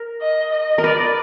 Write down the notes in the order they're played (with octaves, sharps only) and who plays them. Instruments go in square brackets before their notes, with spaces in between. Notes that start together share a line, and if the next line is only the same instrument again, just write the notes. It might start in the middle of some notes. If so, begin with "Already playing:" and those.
Already playing: [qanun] A#4
[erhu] D#5
D#5
[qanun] A#4
[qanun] B4 [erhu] D5